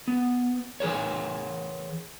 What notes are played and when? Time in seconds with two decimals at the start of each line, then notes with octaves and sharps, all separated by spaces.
0.08 B3
0.80 E3 G#4 A#4 C#5